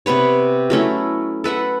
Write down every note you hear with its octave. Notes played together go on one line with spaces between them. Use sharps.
C3 B3 B4 C#5
F#3 A3 C#4 E4
A4 B4 E5 F#5